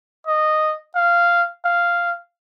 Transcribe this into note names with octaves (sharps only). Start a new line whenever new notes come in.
D#5
F5
F5